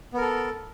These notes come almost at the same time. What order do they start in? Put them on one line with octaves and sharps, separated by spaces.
B3 A#4 A4